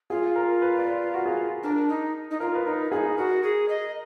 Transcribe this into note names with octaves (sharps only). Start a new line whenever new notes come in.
F4 G#4
A#4
B4
D5
B4
F#4
G#4
D4 A#4
D#4
D#4
F4 A#4
B4
D#4 A#4
D#4 F4 G#4
F#4 A#4
G#4
D#5